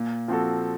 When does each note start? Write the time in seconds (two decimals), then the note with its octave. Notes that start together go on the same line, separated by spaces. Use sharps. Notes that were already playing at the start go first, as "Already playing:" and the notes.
Already playing: A#2
0.28 F3 C4 F#4 A4